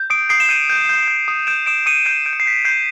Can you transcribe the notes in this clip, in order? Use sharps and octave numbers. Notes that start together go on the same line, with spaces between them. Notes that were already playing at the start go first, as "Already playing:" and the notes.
Already playing: G6
D#6 C7 D7
D#6 C7 D7
E7
G6 C#7 D#7
G6
G6
G6
D#6
G6 D7 E7
D#6 D7 E7
D#6 C#7 D#7
G6 C7 D7
G6 D7
C#7
C7
G6 B6 C#7
G6 C7 D7